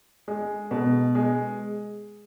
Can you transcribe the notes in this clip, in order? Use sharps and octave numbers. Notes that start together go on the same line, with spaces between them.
G#3
B2
G#3